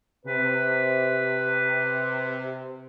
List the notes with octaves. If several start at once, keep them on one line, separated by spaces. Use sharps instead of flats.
C3 B4